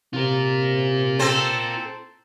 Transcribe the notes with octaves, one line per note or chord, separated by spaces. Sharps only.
C3 F4 A#4
C4 A4 C5